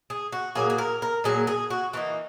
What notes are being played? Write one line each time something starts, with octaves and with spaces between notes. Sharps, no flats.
G#4
F#4
A#2 F#3 A#3 G#4
G#4
A#4
A#4
A#2 F#3 A#3 G#4
G#4
F#4
E3 A#3 D#4 F#4